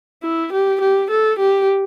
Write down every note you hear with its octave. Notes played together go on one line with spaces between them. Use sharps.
E4
G4
G4
A4
G4